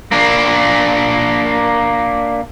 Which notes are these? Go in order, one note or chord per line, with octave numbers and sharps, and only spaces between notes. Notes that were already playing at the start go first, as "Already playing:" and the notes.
A#3 D4